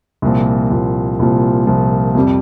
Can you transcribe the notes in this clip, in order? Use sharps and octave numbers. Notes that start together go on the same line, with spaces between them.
C2 A#2 F3
C2 A#2 F3
C2 A#2 F3
C2 A#2 F3
F2 C3 G3